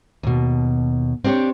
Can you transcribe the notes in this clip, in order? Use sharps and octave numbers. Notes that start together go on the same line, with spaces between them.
D#2 B2
C4 D4 G4 A#4 C#5